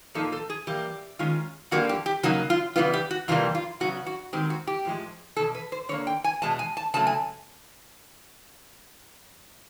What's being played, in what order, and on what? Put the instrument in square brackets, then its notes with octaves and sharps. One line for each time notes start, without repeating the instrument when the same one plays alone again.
[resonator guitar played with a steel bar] A#2 F3 A#3 D#4 A4
A4
G#4
E3 G3 A#3 G4
D#3 G#3 C#4 F4
F2 D3 G3 A#3 F#4
G4
G4
C#3 F#3 A#3 D#4 F#4
F4
C#3 E3 G3 B3 F4
G4
F#4
F2 C3 E3 G3 A#3 F4
F4
C#3 F#3 B3 F#4
F#4
D#3 G#3 C4 G4
F#4
G4
A2 F3 G#3
E2 B2 A4
B4
C5
D3 G3 A#3 C#5
G5
G#5
E2 B2 G#3 A5
G#5
A5
C#3 F#3 A3 A5
G#5